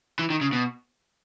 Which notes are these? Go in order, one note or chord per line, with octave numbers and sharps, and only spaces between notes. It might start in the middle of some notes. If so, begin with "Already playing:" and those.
E3
D#3
C#3
B2